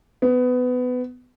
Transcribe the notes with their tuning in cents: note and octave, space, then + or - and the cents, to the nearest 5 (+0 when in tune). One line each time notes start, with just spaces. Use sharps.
B3 +20